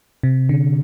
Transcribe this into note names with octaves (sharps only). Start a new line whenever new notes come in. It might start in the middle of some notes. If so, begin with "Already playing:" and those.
C3
D3